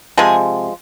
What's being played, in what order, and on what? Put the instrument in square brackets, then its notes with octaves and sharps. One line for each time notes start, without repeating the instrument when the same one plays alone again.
[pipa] C3 F3 G#3 G#4